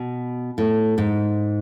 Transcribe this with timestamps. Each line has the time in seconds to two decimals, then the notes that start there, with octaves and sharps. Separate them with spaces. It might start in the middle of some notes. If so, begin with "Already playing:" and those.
Already playing: B2
0.58 A2
0.98 G#2